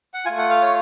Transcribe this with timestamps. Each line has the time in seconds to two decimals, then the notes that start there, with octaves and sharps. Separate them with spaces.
0.14 F#5
0.25 A3 F4 G#5
0.38 F#5
0.50 F5
0.62 C#5